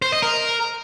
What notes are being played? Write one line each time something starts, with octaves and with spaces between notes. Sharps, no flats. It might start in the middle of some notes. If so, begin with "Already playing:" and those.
C5
D#5
A#4